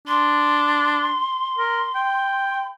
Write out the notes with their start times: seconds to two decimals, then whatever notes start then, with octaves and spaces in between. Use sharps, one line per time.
0.08 D4 C6
1.59 A#4
1.95 G5